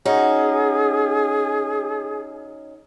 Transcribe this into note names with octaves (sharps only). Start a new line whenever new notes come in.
C#4 D#4 F#4 G#4